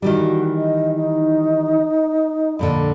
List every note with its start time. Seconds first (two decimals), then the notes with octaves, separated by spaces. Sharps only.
0.02 D#3 E3 G3 F#4
0.56 D#5
0.97 D#4
2.59 F2 A#2 D3 B5